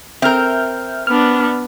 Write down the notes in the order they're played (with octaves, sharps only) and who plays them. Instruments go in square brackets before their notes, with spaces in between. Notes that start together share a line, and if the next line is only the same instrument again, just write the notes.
[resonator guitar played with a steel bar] C4 A#4 [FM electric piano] E5 F6 G6
[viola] B3 D4 [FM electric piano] F6